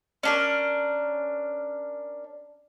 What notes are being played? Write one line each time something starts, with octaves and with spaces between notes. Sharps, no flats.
C#4 D4 A#4